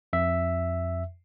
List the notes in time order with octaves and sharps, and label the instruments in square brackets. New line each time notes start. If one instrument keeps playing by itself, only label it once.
[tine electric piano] F2 E5